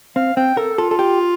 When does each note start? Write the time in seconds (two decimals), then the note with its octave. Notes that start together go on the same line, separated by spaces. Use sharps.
0.16 C4 F5
0.37 C4 G5
0.57 A4 A#4
0.78 F4 A4
0.91 A4
0.99 G4